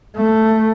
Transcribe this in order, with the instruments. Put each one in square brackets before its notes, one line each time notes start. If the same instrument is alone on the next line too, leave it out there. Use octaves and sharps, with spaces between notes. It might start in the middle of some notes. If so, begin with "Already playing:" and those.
[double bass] A3